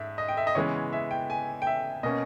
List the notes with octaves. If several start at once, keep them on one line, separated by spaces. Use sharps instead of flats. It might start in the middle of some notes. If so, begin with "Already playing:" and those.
Already playing: G#2 E5
D#5
G5
E5
D#5
C#3 E3 G#3 B3 C#5
E5
G5
G#5
G5
E5
B2 A#3 C#4 D#5